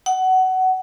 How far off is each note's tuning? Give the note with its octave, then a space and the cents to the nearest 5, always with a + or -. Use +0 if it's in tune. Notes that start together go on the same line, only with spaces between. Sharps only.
F#5 +20